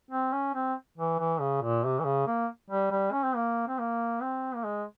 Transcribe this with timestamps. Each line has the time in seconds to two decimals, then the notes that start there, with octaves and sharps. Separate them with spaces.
0.11 C4
0.33 C#4
0.54 C4
0.98 E3
1.19 E3
1.40 C#3
1.62 A#2
1.85 C3
1.99 E3
2.05 C#3
2.27 A#3
2.70 G3
2.91 G3
3.12 C#4
3.24 C4
3.35 A#3
3.67 C4
3.79 A#3
4.21 C4
4.55 A#3
4.64 G#3